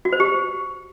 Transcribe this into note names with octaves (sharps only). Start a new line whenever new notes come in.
F#4
C5
G4